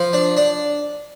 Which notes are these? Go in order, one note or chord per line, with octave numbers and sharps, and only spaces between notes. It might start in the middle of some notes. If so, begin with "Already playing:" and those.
Already playing: F3 F5
D4
D4